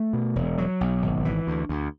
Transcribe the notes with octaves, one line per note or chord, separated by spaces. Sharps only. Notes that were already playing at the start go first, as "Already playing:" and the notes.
Already playing: A3
B2
E1
F#3
B1
G#1
E3
D2
D2